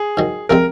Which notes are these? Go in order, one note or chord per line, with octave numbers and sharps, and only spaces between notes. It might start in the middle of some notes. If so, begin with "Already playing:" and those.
Already playing: G#4
G#2 D#3 F#3
C3 F3 G#3 C4 A#4